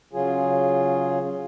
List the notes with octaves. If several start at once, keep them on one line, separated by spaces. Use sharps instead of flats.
C#3 F#3 F4 G#4